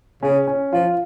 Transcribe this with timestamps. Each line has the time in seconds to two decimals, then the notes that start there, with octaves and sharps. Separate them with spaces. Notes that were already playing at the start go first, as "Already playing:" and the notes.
0.23 C#3 C#4
0.47 C#4
0.73 F3 F4